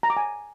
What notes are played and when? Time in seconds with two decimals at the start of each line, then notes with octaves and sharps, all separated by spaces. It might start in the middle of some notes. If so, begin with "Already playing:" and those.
0.03 A#5
0.10 D6
0.17 G#5